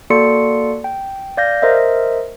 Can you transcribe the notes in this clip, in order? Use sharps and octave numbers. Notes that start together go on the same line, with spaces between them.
A#3 F#4 A4 D5 C6 C#7
G5
D5 F5 G6 A#6
A#4 C5 D#5 E5